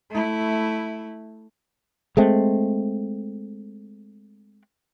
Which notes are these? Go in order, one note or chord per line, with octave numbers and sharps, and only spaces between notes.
A3 E4
G#3 A3 C4